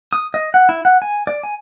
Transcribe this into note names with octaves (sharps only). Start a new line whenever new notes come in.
D#6
D#5
F#5
E4
F#5
G#5
D5
G#5